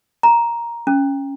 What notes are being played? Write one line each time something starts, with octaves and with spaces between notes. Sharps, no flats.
A#5
C#4